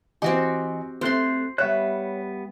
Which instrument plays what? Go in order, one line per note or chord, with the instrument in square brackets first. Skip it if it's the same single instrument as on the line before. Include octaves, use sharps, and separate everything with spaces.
[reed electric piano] E3 D#5 G#5 [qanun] C4 F#4 G4
[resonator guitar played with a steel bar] A3 G4 [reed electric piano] C4 F#6 [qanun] C5 C6
[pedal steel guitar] G3 B3 F#6 [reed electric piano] C#5 [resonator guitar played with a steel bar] E5